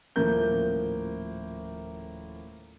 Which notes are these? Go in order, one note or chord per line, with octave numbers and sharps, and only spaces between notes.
D#1 A2 F3 A#3 G6